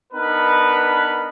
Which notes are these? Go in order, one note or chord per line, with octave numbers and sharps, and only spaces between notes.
B3 D4 D#4 A#4 B4